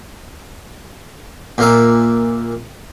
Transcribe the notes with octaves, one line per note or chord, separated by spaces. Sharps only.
A#2 A#3 E5